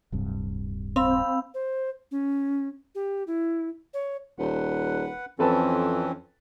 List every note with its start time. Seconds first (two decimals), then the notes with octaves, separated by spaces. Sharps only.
0.12 D1 G2 C3
0.96 C4 F5 B5 E6
1.54 C5
2.11 C#4
2.95 G4
3.27 E4
3.94 C#5
4.38 D#1 B4 F#5
5.39 F2 E3 C4 C#4 A4 B4 A5